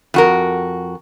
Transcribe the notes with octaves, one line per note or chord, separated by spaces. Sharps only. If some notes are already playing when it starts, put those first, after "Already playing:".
F2 F#4 A#4